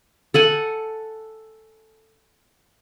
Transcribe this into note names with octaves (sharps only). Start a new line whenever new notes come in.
A4 F#5 G#5